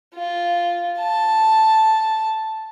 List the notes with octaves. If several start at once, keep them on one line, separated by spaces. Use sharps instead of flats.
F4
A5